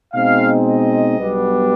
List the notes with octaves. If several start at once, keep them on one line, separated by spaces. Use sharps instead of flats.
B2 G#3 C4 D#4 F5
D#5
B1 B2 G3 B3 D4